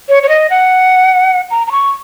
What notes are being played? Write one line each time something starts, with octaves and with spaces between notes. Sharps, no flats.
C#5
C#5
D#5
F#5
A#5
A#5
C#6